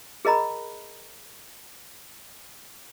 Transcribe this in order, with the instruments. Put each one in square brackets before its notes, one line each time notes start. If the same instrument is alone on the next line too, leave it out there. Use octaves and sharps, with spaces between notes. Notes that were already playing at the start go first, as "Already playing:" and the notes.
[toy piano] G#4 A#4 D#5 A#5 B5